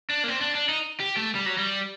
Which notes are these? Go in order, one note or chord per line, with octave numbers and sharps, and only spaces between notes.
D4
A#3
C4
D4
D4
D#4
G4
A3
G3
F#3
G3